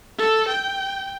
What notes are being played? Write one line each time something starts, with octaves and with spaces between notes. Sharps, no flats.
A4
G5